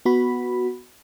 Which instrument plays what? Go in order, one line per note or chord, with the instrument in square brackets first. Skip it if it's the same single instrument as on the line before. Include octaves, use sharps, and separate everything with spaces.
[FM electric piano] B3 F#4 B5